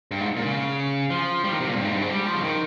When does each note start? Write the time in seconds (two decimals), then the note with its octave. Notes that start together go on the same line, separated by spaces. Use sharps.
0.11 G2
0.20 G#2
0.37 A#2
0.45 C#3
1.10 F3
1.44 G3
1.51 D#3
1.60 C3
1.68 A#2
1.76 G2
1.85 G#2
1.94 G2
2.01 G#2
2.10 G3
2.26 F3
2.35 C#3
2.43 D#3